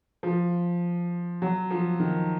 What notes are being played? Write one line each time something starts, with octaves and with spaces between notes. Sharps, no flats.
F3
F#3
F3
D#3